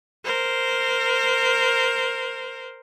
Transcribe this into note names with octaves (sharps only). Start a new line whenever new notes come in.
A#4 C5